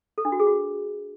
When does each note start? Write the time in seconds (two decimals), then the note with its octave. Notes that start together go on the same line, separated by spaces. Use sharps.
0.18 A4
0.25 D4
0.32 F#4
0.40 G#4
0.47 F#4